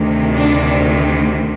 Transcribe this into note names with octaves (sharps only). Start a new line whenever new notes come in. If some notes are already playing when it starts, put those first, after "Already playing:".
Already playing: D2 C3 D#3
D4